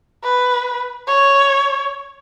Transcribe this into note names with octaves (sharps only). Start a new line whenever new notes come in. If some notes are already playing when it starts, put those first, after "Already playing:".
B4
C#5